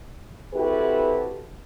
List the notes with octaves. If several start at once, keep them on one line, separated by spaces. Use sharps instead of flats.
C4 E4 F#4 G4 A4 B4